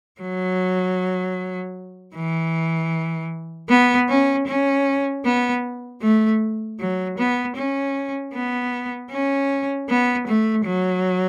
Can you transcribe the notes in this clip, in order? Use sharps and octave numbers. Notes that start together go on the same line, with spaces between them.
F#3
E3
B3
C#4
C#4
B3
A3
F#3
B3
C#4
B3
C#4
B3
A3
F#3